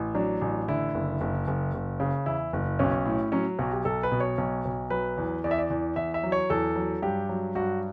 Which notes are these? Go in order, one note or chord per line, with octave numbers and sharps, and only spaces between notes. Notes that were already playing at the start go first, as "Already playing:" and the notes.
Already playing: A1
F#3 D4
A1
D3 E4
F#1
F#1
F#1
F#1
C#3
E2 E4
F#1
B1 C#4
A2
F#3 C#4
B1 F#4
G4
B1 A4
B4
B2
C#5
B1
B1
F#3 B4
E2
E2 D5
E5
D5
E2
E2 E5
E5
F#3
C#5
E2 A4
F#3
G2 G4
F#3
G2 F#4